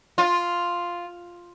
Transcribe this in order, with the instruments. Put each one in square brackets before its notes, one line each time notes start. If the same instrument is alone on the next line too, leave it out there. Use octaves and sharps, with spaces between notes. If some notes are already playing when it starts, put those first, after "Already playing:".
[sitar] F4